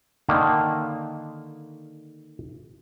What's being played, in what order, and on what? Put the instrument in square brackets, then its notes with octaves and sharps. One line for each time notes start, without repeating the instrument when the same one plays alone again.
[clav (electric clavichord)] D3 D#3 A#3